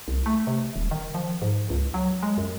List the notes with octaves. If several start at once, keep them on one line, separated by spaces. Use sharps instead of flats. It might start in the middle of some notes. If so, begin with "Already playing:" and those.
C2
A3
C3
D#1
D#3
F3
G#2
C#2
F#3
G#3
F#2